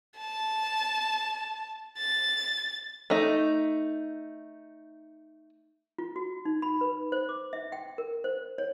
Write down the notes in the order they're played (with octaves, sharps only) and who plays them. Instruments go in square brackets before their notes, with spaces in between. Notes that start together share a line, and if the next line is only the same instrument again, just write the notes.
[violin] A5
A6
[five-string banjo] A3 D#4
[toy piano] F4
F#4
D#4
B5
B4
C5
D6
E5
G5
A#4
C5
C#5